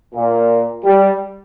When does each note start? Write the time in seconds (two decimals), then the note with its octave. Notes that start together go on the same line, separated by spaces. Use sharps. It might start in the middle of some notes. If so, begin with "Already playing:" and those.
0.14 A#2
0.84 G3